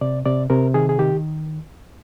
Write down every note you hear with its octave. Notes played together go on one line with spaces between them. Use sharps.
C3 D5
C3 D5
C3 A#4
D#3 G#4
G#4
D#3 G4